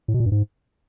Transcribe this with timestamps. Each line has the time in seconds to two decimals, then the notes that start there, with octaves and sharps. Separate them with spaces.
0.08 A2
0.14 B2
0.20 A#2
0.26 G2
0.32 G#2